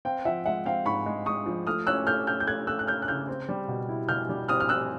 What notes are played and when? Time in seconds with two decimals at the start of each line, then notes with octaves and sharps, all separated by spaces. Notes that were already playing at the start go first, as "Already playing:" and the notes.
0.05 C4 F5 G5
0.25 F3 E5 F#5
0.45 G#3 E5 F#5
0.65 C4 F5 G5
0.86 G#2 B5 C#6
1.06 G#3
1.26 G#3 C#6 D#6
1.46 F3
1.67 A3 D#6 F6
1.87 C#4 E6 F#6
2.07 A3 F6 G6
2.27 C#4 F6 G6
2.40 G6
2.47 A3 F#6 G#6
2.67 A3 E6 F#6
2.79 F#6
2.87 C#4 F6 G6
3.02 F#6
3.08 C#3 F6 G6
3.28 C4
3.49 G3
3.68 B2
3.89 E4
4.09 B2 F6 G6
4.29 G3
4.48 C4 D#6 F6
4.60 F6
4.69 C4 E6 F#6